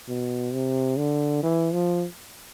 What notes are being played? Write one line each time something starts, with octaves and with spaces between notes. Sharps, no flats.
B2
C3
D3
E3
F3